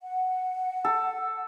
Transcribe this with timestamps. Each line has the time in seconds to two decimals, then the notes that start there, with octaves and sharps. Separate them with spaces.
0.02 F#5
0.85 A4